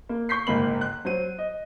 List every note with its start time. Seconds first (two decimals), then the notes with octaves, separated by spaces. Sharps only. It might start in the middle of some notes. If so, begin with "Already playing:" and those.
0.09 A#3
0.29 C#6 G6 B6 C7
0.47 F#1 G#2 A#3 B5 F#7
0.81 F#6
1.05 F#3 C5 D#7
1.38 D#5